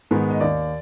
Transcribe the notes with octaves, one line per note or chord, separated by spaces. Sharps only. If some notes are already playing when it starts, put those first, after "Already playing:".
G#2 D#3 G#3 B3
D#5
D#2 D5